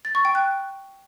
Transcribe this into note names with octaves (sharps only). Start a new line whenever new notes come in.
A6
C#6
G5
F#6